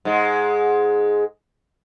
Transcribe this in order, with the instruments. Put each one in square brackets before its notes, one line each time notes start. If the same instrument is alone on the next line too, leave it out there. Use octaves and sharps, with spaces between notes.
[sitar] G#2 G#3